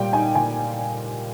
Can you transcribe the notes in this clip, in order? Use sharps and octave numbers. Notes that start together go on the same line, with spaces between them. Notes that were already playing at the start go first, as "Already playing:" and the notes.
Already playing: A#2 G3 G5
D#4 G#5
A#2 G#5